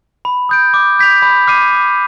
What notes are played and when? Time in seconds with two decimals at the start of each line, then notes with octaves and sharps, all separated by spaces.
0.25 B5
0.49 D#6 G6 D7
0.74 D6
0.99 G6 B6 F7
1.22 B5
1.47 D6 F6 C7 D#7
1.72 D6